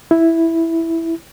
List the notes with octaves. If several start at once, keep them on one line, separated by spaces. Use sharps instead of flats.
E4